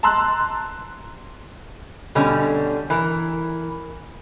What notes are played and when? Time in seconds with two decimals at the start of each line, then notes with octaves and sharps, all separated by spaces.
0.03 A5 A#5 C6 E6 F#6
2.15 B2 D3 G3 C#4
2.90 E3 A#4